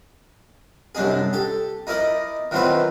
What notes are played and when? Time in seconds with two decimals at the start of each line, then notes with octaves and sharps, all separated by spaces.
0.95 C2 F#2 D4 D#4 G#4
1.33 G4 A4
1.87 D#4 E4 A#4 D5 D#5
2.51 D#3 E3 F#3 C4 F4 B4